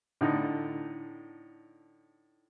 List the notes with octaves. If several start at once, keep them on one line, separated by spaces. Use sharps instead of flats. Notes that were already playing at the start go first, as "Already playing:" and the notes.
A2 D3 D#4